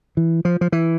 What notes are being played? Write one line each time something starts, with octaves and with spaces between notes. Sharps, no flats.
E3
F3
F3
E3